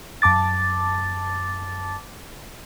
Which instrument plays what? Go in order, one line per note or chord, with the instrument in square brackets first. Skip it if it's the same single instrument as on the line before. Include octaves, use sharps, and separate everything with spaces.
[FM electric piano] F#2 A5 D6 A6